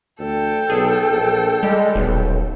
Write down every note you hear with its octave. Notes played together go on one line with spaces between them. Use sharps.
D2 A4 G5
B1 G#4
A#1
G3 G#3
D#1 B1